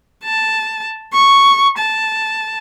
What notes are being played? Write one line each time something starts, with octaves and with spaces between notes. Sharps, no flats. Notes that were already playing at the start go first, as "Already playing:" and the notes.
A5
C#6
A5